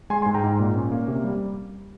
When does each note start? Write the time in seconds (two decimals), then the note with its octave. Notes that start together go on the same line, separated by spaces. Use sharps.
0.10 G#3 G#5 C6
0.22 G#5 C6
0.26 G#2
0.35 G5 A#5
0.44 G#2
0.59 A#2
0.76 C#4
0.92 A#3
1.08 C3
1.24 G3